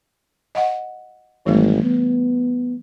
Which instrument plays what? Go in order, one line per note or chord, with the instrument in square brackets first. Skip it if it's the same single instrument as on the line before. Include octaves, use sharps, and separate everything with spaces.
[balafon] D#5 F5 F#5
[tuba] G#1 [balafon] E3 G3 A3
[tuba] B3